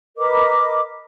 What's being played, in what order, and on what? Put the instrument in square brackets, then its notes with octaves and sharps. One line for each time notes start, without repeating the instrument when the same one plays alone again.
[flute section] A#4 B4 D#5 D6